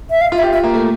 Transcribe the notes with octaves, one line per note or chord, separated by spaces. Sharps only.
E5
F5
F4
E5
G4
F4 E5
A#3
A3